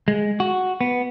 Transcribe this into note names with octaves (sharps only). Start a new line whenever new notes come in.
G#3
F#4
B3